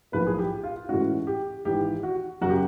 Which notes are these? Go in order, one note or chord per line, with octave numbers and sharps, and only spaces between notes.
B1 A2 F3 A#3 B4
G#4
G4
F4
A2 E3 G#3 C#4 F#4
G4
G#1 G#2 E3 G4
F#4
F#2 C#3 F#4
G4